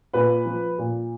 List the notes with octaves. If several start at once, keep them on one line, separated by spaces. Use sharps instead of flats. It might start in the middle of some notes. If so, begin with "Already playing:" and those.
A#2 B4
F3
A#2